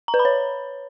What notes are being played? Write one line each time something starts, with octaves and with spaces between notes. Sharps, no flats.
A#5
B4
B5
C#5